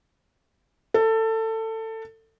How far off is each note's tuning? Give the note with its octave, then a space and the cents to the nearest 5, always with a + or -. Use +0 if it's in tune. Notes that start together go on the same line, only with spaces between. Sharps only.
A4 +20